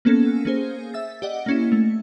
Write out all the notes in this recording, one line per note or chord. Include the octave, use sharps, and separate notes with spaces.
A#3 B3 C#4 A4
A#3 C#4 G#4 C5
E5 E6 A6
G4 D5 D#5 F#5
A#3 C#4 E4
A3